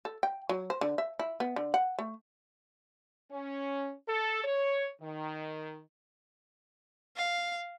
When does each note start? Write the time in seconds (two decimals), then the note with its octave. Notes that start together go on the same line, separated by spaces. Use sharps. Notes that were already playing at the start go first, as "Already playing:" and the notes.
0.05 A4
0.23 G5
0.49 F#3
0.70 C5
0.81 D3
0.98 E5
1.19 E4
1.40 B3
1.56 D3
1.74 F#5
1.99 A3
3.31 C#4
4.09 A4
4.44 C#5
5.02 D#3
7.16 F5